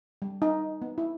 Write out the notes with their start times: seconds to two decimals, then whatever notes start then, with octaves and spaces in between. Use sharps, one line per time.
0.22 G3
0.42 D#4
0.82 B3
0.98 E4